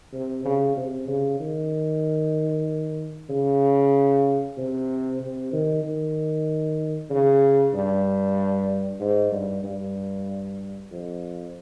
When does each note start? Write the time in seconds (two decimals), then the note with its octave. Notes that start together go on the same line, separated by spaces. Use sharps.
0.13 C3
0.45 C#3
0.76 C3
1.07 C#3
1.39 D#3
3.30 C#3
4.57 C3
5.20 C3
5.52 D#3
5.83 D#3
7.10 C#3
7.73 G2
9.00 G#2
9.32 G2
9.64 G2
10.91 F2